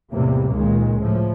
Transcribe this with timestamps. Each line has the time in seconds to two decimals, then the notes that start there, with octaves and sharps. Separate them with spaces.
0.13 E2 A2 C3 G3 A#3
0.53 C#2 A#2 D#3 G#3
1.00 A2 F3